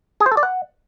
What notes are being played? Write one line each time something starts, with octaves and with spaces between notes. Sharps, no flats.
G#4
C5
A4
D5
F#5